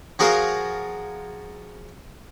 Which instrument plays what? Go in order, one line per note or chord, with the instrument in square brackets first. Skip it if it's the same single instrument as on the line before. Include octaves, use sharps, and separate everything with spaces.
[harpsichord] F3 F#4 G#4 A#4 F5